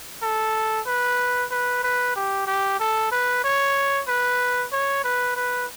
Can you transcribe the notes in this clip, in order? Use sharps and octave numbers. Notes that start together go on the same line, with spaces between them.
A4
B4
B4
B4
G4
G4
A4
B4
C#5
B4
C#5
B4
B4